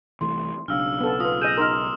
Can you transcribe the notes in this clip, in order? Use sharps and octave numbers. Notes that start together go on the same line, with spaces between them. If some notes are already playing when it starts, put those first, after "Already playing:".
C2 E3 A3 C6
B1 C#3 D4 F5 E6 F6
B3 A4
F4 B4 F5 D#6
G#4 D#5 G6 D#7 E7
D#4 A#4 C6 F6